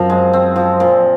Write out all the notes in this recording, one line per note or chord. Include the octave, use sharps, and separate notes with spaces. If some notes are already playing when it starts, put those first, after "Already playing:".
Already playing: F#2 F3 C4 F4 A#4
G#3
C4
F3
A#2